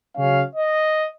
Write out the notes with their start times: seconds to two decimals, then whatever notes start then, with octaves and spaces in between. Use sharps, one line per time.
0.15 C#3 F#3 C#4 F5
0.53 D#5